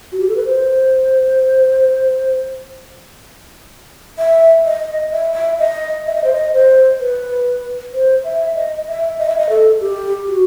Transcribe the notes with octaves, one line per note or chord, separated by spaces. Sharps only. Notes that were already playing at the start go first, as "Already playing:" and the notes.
F#4
G4
A4
B4
C5
E5
D#5
E5
E5
D#5
E5
D#5
C5
D#5
C5
B4
C5
E5
D#5
E5
D#5
E5
D#5
A4
G4
F#4